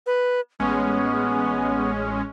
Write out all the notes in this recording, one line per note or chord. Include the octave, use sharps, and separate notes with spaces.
B4
A1 G#3 B3 C#4